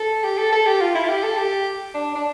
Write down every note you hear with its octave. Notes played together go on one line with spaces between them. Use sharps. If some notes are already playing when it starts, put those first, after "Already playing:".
Already playing: A4
G4
A4
A4
G4
F4
E4
F4
G4
A4
G4
D4
D4